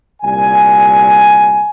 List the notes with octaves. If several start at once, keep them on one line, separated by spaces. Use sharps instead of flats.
C2 A#2 G3 G#5